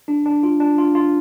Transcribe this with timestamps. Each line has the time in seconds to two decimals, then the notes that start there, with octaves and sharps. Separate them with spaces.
0.08 D4
0.26 D4
0.43 F4
0.60 D4
0.78 F4
0.95 F4